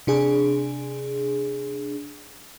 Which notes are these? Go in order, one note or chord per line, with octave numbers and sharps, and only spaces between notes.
C3 D4 G#4